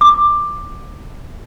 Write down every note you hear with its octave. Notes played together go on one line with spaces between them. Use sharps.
D6